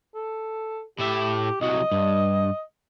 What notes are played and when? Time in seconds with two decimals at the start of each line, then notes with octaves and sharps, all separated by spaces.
0.15 A4
0.99 A2 G4 E5
1.61 C2 F#3 D#5
1.92 G2